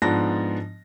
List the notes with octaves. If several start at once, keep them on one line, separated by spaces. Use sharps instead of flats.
G#2 F3 B3 D4 A5 A#6